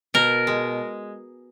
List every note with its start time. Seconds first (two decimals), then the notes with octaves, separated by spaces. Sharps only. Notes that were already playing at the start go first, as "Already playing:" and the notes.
0.14 B2 A#4
0.47 G#3